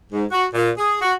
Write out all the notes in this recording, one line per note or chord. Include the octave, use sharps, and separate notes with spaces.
G#2
F#4
A#2
G#4
F#4